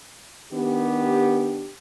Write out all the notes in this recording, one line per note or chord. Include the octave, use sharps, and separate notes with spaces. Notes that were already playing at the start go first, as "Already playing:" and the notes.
D#3 B3 D4 G4